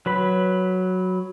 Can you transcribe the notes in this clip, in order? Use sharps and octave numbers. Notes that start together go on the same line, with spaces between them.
F#3 B4 B5